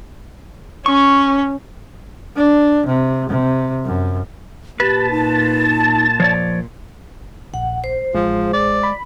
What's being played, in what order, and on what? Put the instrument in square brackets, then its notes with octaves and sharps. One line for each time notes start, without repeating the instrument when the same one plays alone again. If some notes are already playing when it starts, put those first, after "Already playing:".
[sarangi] C#4 [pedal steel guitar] C#6
[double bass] D4
C3
C3
F#2
[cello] A#2 [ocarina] G4 [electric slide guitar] B4 [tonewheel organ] A5
[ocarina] D#4
[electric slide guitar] F3 C#5 D5
[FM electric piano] A#1 [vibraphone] F#5
[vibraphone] C5
[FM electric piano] A1 [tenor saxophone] F3 [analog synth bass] G#3
[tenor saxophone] D5
[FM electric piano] B5